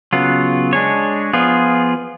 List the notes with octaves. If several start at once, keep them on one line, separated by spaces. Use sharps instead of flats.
C#3 F#3 B3 F4
G#3 D4 G#4 C#5
F3 B3 F4 G#4